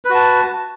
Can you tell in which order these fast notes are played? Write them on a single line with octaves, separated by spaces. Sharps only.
B4 F#4 A5